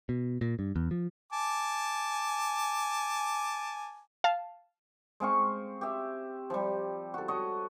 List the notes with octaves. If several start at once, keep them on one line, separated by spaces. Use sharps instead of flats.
B2
A#2
G2
E2
F3
G#5 A5 D6
F5 A5
G#3 C4 F5 C#6
G4 E5
F3 G3
F#4 A4
F#4 C#5 D#5